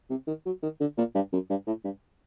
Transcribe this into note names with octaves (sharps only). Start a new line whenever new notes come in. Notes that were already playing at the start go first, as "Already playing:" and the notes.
C3
D#3
F#3
D#3
D3
A#2
G2
F#2
G2
A2
G2